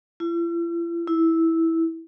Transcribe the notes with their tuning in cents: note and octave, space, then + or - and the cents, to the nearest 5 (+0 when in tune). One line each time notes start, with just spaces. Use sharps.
E4 +45
E4 -10